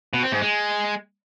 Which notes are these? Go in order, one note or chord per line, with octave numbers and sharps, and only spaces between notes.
B2
C4
G#2
G#3